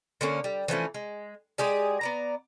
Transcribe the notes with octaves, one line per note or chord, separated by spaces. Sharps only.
D3 A#3 C#4
G3
E3 F3 A3 C#4
G#3
G#3 G4 G#4 D5
B3 D5 A#5